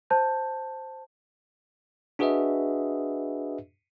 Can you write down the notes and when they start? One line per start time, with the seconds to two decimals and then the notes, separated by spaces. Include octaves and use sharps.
0.10 C5 A5 G6
2.19 D4 F#4 G#4 B4 D#5 E5